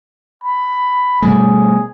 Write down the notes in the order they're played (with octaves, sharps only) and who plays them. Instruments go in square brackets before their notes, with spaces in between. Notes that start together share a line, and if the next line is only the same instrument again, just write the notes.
[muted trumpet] B5
[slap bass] B2 G3 A3 [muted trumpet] G#4